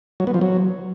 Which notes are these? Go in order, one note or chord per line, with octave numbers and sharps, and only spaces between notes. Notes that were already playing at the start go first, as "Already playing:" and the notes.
F#3
B3
F3
F#3